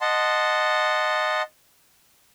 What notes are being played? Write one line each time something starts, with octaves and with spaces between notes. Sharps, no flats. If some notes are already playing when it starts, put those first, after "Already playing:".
D#5 F#5 A5 C6